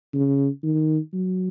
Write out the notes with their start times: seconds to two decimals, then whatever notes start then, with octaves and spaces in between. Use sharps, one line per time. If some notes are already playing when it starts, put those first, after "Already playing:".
0.14 C#3
0.64 D#3
1.13 F#3